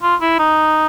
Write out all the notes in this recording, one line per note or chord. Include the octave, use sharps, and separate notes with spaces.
F4
E4
D#4